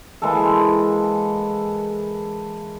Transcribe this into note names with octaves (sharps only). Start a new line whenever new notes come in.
E3 G#3 A#3 A4